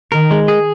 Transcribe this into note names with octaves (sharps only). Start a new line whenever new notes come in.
D#3 A#4
G#3
G#4